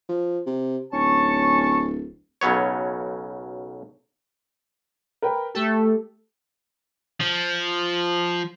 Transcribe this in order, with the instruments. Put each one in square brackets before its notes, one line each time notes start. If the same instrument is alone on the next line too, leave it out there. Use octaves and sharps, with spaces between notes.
[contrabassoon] F3
C3
[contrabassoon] D1 [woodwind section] C#4 A5 C#6
[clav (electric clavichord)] B1 C#3 F#3 B3 C#5
[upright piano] A#4 B4 G5
[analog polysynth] A3 A4 [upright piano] G4
[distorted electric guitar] F3